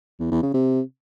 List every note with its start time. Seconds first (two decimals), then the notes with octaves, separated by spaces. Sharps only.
0.20 E2
0.31 E2
0.43 C#3
0.54 C3